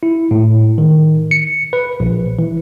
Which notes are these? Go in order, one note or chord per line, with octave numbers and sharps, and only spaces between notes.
E4
A2
D#3
C#7
B4
A#1
E3